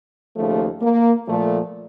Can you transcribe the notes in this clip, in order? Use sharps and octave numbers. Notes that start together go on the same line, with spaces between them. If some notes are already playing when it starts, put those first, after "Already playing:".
D#2 C#3 F3 A3
A#3
A#2 F3 A3